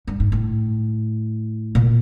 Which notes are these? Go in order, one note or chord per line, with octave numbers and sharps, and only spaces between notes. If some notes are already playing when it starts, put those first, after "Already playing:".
G2
G#2
A2
A#2